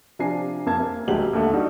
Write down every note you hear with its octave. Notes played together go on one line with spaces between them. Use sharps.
C3 F3 D4 G#5 A#5 C7
F2 A#3 A5 G#6
A#3
D#1 D2 F#3 G#3 G4 F#7
D#2 D3 A3
G3 D4 D#4 F#4